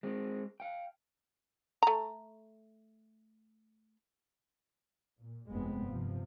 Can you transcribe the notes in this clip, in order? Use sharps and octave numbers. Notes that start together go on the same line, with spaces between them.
G#3 C4
F5 G5
A3 A#5
A#2
F1 G2 G#3 B3 C4
G2 C3 F3